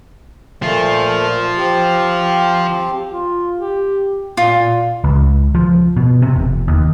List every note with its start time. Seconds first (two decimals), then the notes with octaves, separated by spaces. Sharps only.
0.62 A#2 F3 A3 F4
1.58 C4 G4
3.10 F4
3.58 G4
4.37 A#2 F4
5.04 C#2
5.55 F3
5.97 B2
6.22 C3
6.36 F1
6.68 D#2